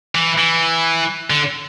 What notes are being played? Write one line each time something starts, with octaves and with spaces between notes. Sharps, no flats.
E3
E3
D3